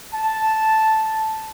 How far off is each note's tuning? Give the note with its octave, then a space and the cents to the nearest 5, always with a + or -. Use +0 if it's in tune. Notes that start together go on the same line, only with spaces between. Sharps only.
A5 -5